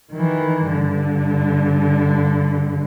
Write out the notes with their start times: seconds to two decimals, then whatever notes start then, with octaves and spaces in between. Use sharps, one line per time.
0.12 D#3 E3
0.69 G2 D3